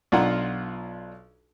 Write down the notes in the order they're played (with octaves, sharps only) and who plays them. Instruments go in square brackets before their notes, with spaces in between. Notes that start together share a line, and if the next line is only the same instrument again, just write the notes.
[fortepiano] B1 D4 F4 F#5 A#5